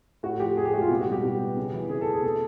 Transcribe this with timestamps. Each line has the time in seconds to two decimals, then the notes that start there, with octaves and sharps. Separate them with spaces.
0.23 A2 F#4
0.40 F3 G4
0.57 A2 G#4
0.65 G4
0.73 G#3 F#4
0.81 F4
0.90 B2 F#4
1.01 F#4
1.07 G3 G4
1.23 B2
1.40 B3
1.56 C#3
1.74 E3
1.90 C#3 G#4
2.01 A4
2.07 A3
2.13 G#4
2.23 B2 A4